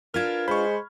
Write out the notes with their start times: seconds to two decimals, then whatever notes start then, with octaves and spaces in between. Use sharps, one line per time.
0.14 D4 F4 A#4 B4 F6 G#6
0.48 G#3 C5 B5 C#6